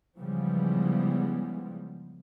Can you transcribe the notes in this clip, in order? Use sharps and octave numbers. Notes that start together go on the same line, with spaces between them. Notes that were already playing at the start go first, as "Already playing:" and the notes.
C#3 E3 F3 G3 G#3 B3